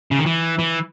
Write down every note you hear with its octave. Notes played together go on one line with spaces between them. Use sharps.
C#3
D#3
E3
E3